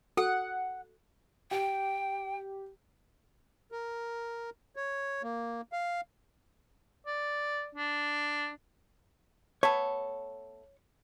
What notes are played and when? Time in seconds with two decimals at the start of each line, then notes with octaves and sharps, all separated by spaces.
0.17 F#4 A4 F#5
1.51 G4 G5
3.72 A#4
4.76 C#5
5.23 A#3
5.73 F5
7.06 D5
7.75 D4
9.63 A3 B3 A4 C#5